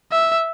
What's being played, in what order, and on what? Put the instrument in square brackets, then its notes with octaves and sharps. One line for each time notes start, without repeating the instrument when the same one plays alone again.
[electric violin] E5